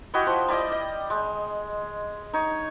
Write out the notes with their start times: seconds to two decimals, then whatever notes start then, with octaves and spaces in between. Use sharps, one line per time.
0.14 E4 F#4 G4 D#5
0.27 F3
0.48 G3 E4 D5 D#5
0.72 D#5
1.10 G#3
2.33 D#4 C#5